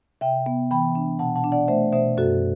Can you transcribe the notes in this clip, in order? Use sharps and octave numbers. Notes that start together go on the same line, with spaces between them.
C3 E5 G5
B3
E3 G5 B5
D4
B2 F#5 A5
F#5 A5
D4
D5 F#5
A3 C5 E5
B2 C5 E5
F#2 F#4 A4